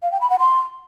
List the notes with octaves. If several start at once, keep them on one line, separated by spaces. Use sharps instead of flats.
F5
G5
B5
F#5
C6